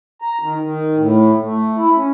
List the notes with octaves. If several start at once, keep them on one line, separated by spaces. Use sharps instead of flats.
A#5
D#3
D#3
A2
A3
E4
C#4